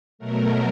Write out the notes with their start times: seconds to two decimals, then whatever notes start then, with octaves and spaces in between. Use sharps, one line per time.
0.19 B2 F#3 A3 A#4